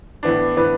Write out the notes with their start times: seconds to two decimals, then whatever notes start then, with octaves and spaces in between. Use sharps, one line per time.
0.23 A2 E3 B3 D4
0.56 A2 E3 B3 D4 B4